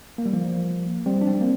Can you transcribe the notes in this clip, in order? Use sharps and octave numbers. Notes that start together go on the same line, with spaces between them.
A#3
G3
F3 A#3
G3 C4
D4
G3 C4
A#3